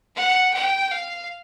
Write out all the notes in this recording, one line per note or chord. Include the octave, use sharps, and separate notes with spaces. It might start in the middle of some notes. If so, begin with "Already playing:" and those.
F#5
G5
F5